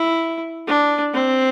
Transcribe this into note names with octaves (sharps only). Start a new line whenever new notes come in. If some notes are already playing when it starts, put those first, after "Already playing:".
Already playing: E4
D4
C4